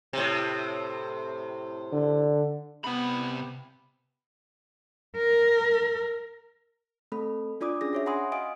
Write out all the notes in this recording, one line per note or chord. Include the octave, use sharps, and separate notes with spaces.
A2 C3
D3
C3 B3 B5
A#4
A3 C4 A4 B5
D4 F4 D5 D6 D#6
C#4 D4 G#4 A#6
F#4 C#5 E5
F#5 G#5 B5 C6 D#6
D#5 F5 G#5 D#6 D7